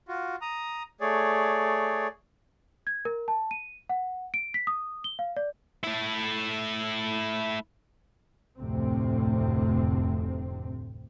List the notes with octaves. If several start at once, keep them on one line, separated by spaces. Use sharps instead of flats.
F4 F#4
A#5 D#6
A3 G#4 C#5 D5
G#6
A#4
A5
D#7
F#5
D7
B6
D#6
G7
F5
D5
A3 E4
F1 D2 A2 C3 C4